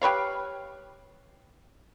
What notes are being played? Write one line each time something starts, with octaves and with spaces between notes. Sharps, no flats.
G4 B4 C#5 F5